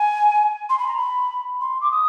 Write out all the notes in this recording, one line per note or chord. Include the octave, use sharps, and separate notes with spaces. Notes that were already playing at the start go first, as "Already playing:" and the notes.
Already playing: G#5
C6
B5
A#5
B5
C6
D6
D#6